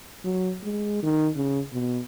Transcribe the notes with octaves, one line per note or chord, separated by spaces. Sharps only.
F#3
G#3
D#3
C#3
B2